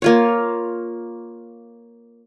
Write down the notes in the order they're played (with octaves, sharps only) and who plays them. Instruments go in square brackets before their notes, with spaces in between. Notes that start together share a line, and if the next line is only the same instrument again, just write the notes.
[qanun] A#3 F4 C#5